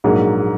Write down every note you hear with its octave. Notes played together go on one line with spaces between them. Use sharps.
A#1 G#2 F#3 A#3